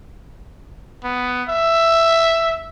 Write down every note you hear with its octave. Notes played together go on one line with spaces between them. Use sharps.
B3
E5